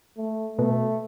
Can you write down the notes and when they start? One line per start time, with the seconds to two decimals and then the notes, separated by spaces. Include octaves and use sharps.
0.18 A3
0.59 B2 A3